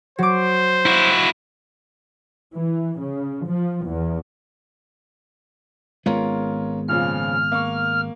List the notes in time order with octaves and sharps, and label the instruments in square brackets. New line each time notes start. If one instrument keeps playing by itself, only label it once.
[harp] F#3 D6 [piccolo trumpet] C5
[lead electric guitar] E4 F#4
[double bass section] E3
C#3
F3
E2
[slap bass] G#1 G#3 B3 [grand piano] C#4 F4 A#4
[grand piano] A#2 C#3 F3 [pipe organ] F6
[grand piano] A#3 C#6